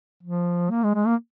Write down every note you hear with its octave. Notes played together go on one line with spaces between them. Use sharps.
F3
A#3
G#3
G#3
A#3